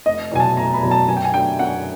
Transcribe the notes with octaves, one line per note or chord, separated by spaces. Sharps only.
F1 D#5
E2 B2 F#3 G#5
A5
F1 A#5
B5
E2 B2 F#3
A5
F#2 G#5
G5
G#5
D3 F#3 A3 G5
F#2 F#5